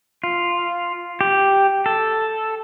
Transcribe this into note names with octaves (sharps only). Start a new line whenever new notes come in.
F4
G4
A4